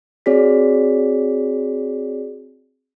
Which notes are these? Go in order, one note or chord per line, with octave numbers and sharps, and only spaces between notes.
C4 F#4 G#4 C#5 D5 B6